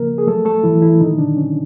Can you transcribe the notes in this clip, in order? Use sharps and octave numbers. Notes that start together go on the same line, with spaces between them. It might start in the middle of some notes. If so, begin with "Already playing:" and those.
Already playing: C#3 F3 A#3 A#4
G#4
F#3 A3 A4
A3 A4
E3 F#3 E4
E3 E4
A#2 D#3 D#4
D3 D4
F#3 C#4